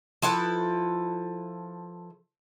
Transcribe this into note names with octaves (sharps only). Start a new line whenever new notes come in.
F3 E4 A4 B4